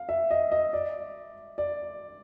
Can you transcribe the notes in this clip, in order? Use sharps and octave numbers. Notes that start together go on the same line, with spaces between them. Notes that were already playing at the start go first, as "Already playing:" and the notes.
Already playing: F5
E5
D#5
D#5
D5
D5